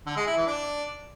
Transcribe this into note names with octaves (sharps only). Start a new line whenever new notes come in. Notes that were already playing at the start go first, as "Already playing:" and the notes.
D3
G#3
E4
E3
D4